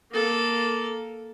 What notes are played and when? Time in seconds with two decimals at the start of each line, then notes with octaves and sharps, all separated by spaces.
0.12 A#3 A4